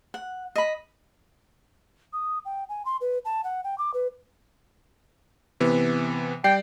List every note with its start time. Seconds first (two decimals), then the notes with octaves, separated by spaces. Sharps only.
0.14 F#5
0.56 D#5 B5
2.13 D#6
2.45 G5
2.69 G#5
2.85 C6
3.01 B4
3.25 A5
3.44 F#5
3.64 G5
3.78 D6
3.94 B4
5.60 C3 E3 B3
6.44 G3 D5 G5 C7